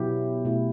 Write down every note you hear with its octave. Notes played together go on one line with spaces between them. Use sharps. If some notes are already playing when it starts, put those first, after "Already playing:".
Already playing: B2 F#3 B3 E4 G4
B2 A3 E4